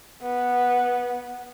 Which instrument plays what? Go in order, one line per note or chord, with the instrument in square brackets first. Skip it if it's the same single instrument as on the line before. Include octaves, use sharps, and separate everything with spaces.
[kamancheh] B3